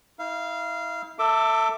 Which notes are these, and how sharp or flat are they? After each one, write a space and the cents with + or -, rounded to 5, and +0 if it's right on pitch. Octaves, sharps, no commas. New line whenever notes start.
E4 -40 F5 -20
A4 +30 E5 +0 D6 +0